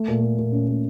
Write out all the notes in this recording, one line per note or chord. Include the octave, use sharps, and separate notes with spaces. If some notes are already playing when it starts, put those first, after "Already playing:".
Already playing: A3
A#2
A3
A#2
C#4
A#2